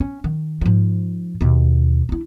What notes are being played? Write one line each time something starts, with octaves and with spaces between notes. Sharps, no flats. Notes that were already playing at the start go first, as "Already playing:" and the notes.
C#4
D#3
G#2 F3
D#2 B2
D4 E4